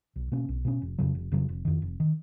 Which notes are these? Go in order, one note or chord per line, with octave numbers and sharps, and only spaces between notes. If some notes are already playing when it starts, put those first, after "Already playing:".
B1
B2 A#3 C#4
B1
B2 A#3 C#4
F1
F2 C#3 F#3
F1
F2 C#3 F#3
F1
F2 D#3
F1
D#3